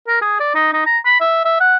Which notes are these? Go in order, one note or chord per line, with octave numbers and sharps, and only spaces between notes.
A#4
G#4
D5
D#4
D#4
A#5
B5
E5
E5
F#5